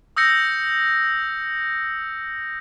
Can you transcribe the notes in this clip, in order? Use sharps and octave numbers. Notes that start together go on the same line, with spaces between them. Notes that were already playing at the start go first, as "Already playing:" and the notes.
D#6 E6 G6 A#6 C#7